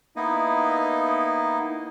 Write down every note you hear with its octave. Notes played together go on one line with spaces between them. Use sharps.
A#3 B3 D#4 E4 D#5